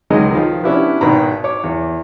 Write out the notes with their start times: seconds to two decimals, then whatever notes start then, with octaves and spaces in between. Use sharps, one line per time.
0.10 C#2 D#3 F#3 G#3 D#5 D#6
0.31 D#3 F3
0.64 B3 C#4 D4 E4 G4 B4
1.01 G#1 B2 D#3 B4 A#5 B5
1.44 C#5 D6
1.64 E2